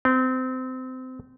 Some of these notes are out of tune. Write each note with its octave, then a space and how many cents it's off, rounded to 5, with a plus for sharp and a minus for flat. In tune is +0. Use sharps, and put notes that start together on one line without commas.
C4 -25